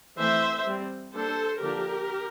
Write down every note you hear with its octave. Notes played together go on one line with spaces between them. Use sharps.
E3 A3 C4 C5 E5
G3 C4
G3 A#3 D4 A4 C5
D3 F3 A#3 D4 G4 A#4